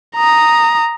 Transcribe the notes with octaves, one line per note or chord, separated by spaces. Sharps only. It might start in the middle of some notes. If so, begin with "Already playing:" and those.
A#5 D#6